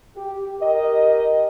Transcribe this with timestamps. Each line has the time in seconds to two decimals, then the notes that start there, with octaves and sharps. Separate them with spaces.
0.16 G4
0.60 G4 A#4 D#5